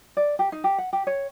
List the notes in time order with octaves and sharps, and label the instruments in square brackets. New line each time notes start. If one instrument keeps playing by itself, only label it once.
[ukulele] D5
G4
D#4
G4
F#5
G4
C#5